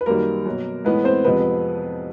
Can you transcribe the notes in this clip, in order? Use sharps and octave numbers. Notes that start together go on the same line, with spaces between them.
B4
F#2 D#3 G3 A#3 A#4
B2 F#3
A2 E3 G#3 B3 B4
C4 C5
F2 C3 F3 G#3 B3 B4